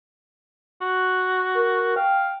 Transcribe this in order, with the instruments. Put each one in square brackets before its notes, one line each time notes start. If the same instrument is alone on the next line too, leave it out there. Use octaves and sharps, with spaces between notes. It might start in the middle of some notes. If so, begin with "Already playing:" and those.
[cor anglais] F#4
[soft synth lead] A#4
[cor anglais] F5 [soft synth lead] G5